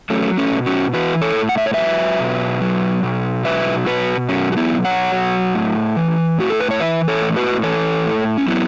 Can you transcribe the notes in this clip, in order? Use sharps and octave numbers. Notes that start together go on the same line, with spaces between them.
F#3 A3 C#4
A3 C#4
B2
C#4 F#4
E3 F#4 B4
A4 C#5
A2
F#5
E5
C#5
F#3 B4 E5
B2
F#3
B2
F#3 B4 E5
B2 F#4 B4
F#3 C#4 F#4
F#4
B3 E4
B2
C#5 F#5
F#3
A2
E3
A2 F#4
A4
B4
C#5
E3 B4 E5
A4 C#5
A2
F#4 B4
E3 A4 C#5
A2
C#4
F#3 B3 E4